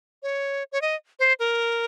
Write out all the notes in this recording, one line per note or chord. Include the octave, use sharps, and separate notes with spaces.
C#5
C#5
D#5
C5
A#4